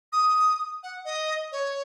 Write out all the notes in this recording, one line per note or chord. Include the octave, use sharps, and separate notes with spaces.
D#6
F#5
D#5
C#5